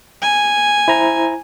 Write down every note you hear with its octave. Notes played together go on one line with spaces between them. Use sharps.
G#5
E4 C5 A#5